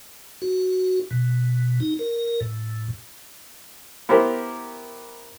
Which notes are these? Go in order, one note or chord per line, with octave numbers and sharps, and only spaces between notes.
F#4
B2
D#4
A#4
A2
B3 E4 G4 A#4 C5